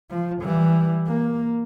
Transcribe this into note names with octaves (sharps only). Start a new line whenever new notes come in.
F3
E3 G3
A#3